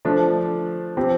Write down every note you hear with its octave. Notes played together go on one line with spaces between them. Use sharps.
F3 A3 D4
F3 C4 G4